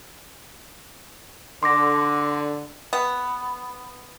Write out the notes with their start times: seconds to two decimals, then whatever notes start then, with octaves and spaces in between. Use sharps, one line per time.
1.63 D3 C6 D6 A#6
2.93 B3